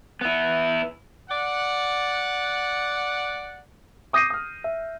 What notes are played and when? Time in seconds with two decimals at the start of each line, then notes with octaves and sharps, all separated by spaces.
0.21 B3 E4
1.30 D5 F#5
4.13 D6 D#6 G6 A#6 C7 D#7
4.30 D#6 F6
4.64 E5